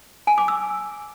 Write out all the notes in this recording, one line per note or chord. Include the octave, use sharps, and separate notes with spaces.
G#5
D6
E6